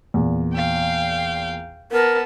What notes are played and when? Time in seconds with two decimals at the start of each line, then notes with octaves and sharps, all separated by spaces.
0.14 E2 A#2
0.54 F5 G5
1.92 B3 A#4 A5